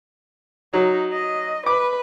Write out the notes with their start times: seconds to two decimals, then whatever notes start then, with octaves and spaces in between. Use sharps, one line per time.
0.73 F#3 D#4
1.13 D#5
1.66 B4 D6